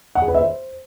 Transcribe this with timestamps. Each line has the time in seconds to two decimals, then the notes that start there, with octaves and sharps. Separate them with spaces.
0.15 F#5
0.22 G#4
0.28 B4
0.34 E5
0.41 C5